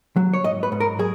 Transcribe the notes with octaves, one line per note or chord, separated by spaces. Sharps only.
F#3
C#5
G#2 D#5
B4
G#2
A#4
F#3 G#4